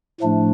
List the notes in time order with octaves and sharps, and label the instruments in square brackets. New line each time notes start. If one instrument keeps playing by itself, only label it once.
[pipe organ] A2 F3 A3 D4